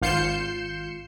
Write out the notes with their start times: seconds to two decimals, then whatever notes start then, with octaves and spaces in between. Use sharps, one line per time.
0.01 G#1 F4 G6 C7 C#7 E7